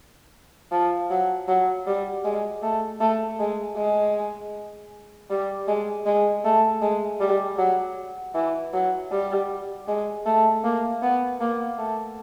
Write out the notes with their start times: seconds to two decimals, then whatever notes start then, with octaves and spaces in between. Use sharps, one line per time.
0.72 F3
1.10 F#3
1.48 F#3
1.87 G3
2.24 G#3
2.63 A3
3.00 A3
3.39 G#3
3.77 G#3
5.30 G3
5.68 G#3
6.06 G#3
6.45 A3
6.82 G#3
7.20 G3
7.58 F#3
8.35 E3
8.73 F#3
9.12 G3
9.88 G#3
10.26 A3
10.64 A#3
11.02 B3
11.40 A#3
11.78 A3